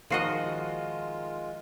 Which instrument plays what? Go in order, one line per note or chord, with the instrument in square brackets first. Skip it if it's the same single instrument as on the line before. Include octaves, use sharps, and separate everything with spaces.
[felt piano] D#3 A#4 C7 [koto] F3 F#4 D#5 [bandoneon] G#3 F4